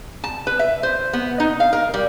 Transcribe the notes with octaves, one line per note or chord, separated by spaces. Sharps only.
A5
B4
E5
C5
B3
D#4
F5
A#4
G3